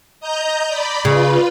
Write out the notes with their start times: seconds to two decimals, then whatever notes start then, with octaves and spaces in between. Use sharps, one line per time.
0.20 D#5 A#5 G6
0.68 D5 B5
1.05 C#3 F4 B4